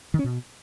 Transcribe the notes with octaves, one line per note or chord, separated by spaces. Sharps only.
D#3
C#4
B2